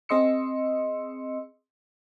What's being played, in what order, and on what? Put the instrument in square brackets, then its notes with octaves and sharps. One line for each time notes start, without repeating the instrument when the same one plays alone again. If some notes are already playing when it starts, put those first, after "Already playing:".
[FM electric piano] C4 G#4 D#5 C6 E6 C#7